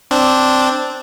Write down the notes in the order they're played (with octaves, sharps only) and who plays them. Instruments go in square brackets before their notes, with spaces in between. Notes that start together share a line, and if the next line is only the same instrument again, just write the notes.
[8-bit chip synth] C4 D4